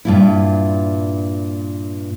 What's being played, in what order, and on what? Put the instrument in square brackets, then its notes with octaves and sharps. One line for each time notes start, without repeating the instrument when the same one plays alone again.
[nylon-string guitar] G2 A#2 E4